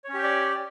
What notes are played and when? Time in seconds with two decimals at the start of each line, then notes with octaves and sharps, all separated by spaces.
0.04 C#5
0.09 C#4
0.14 G4
0.19 G5
0.23 D5